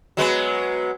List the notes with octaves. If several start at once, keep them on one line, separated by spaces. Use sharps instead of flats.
F#3 G#3 B3